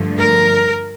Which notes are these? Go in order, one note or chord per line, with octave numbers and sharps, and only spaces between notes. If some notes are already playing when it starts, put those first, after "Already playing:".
Already playing: G2 D3 F3 A3
A#4